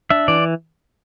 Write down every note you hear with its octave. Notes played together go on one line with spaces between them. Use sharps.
D4 E5
E3 D5